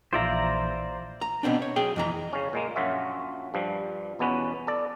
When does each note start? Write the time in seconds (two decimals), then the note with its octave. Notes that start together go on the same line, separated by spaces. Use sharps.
0.13 A#1 E3 F4 C5 D5 E5 A#5
1.21 A#5
1.43 B2 B3 C4 D4
1.62 C#5
1.76 B1 G#4 G5
1.96 F2 E3 A#5
2.33 C#3 C#4
2.53 A#2 G#3 A#3
2.76 A#1 F#2 F4 F#4 C#5 E5
3.54 G2 F3 G3
4.19 E2 B2 B3 C#4 B4
4.67 A4 D5